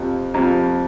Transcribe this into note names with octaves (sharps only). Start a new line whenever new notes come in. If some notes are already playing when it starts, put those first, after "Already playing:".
Already playing: F2 C3 F3
F2 C3 F3